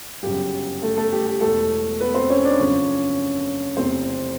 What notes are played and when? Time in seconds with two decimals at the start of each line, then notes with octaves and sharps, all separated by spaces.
0.23 G1 F#2 C#3 G4
0.82 A3 A4
0.97 A3 A4
1.12 G4
1.27 G4
1.41 E1 E2 B2 A3 A4
2.00 B3 B4
2.15 C4 C5
2.30 C#4 C#5
2.44 D4 D5
2.59 F#1 F2 C#3 C#4 C#5
3.76 F1 E2 C3 C4 C5